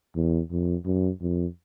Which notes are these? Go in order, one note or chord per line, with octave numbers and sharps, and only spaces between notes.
E2
F2
F#2
F2